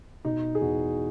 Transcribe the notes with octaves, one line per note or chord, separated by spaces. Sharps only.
B2 D#4
G#4
E2 F#4